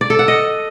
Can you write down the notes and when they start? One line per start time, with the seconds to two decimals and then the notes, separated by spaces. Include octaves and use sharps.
0.01 D5
0.10 A4
0.19 F#5
0.28 D#5